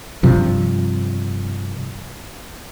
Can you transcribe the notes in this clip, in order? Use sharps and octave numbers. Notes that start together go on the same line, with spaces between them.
G2 C3 F3